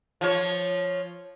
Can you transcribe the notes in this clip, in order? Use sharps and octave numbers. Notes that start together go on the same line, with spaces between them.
F3 C#5